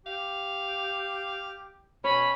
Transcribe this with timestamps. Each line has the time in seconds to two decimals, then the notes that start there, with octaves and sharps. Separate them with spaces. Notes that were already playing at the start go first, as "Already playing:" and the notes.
0.06 G4 F5
2.04 B2 C#4 C#5 B5